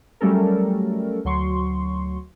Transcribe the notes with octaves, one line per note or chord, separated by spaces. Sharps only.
F#3 G3 A3 C#4 A4 A#4
D2 F#3 C6 C#6